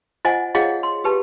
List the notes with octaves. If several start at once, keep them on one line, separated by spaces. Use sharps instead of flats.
F4 C5 D#5 F#5 G#5
F4 G#4 C#5 D#5 F5 F#5
C6
G4 B4 A5